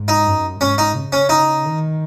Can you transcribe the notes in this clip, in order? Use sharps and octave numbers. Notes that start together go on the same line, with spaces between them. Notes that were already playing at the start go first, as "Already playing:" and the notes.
Already playing: G#2
D#4
F#2
G#2 C#4
D#4
C#3
C#4
D#4
D#3